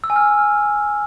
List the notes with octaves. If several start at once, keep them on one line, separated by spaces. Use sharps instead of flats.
E6
G#5
F6